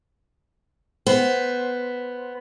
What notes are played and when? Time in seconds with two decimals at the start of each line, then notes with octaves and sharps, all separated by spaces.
1.07 B3 C5